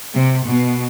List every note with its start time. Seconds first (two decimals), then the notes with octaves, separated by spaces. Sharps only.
0.15 C3
0.46 B2